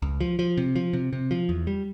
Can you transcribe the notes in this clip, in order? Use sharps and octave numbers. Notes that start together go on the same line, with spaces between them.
C#2
F3
F3
C3
F3
C3
C3
F3
E2
G3